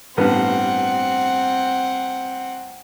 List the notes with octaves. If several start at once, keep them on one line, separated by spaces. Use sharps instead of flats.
A1 G2 B3 C4 F#5